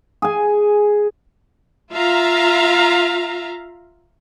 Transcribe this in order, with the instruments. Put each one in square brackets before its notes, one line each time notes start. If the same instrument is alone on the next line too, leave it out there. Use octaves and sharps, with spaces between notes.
[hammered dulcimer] G#4 G#5
[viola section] F4 E5 F5 A#5